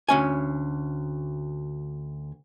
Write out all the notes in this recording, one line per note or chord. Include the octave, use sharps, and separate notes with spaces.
D2 C#4 G#5